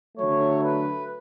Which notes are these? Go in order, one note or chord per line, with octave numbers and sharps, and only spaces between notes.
D3 F#3 A3 C#5
B4